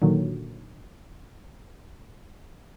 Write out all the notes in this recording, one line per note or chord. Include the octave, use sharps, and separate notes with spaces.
A#2 D3 D#3 F#3